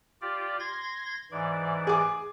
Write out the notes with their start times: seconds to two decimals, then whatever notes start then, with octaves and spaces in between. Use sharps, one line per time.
0.21 F4 G4 D5
0.60 C6 G#6 A#6
1.31 G#2 E3 D5
1.87 G#4 D6